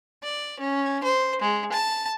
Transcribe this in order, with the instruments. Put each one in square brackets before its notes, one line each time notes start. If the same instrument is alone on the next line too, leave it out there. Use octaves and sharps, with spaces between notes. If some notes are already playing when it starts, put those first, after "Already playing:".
[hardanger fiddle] D5
C#4
C5
G#3
A5